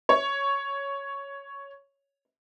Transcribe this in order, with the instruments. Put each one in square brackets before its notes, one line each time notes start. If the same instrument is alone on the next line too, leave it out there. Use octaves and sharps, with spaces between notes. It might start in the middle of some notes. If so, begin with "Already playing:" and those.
[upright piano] C#5